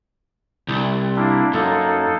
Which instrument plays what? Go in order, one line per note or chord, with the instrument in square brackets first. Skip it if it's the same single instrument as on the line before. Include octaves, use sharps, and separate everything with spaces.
[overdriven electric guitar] C2
[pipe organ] A#3 D4 E4
[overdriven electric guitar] F#2 [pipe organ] A#3 D#4 A4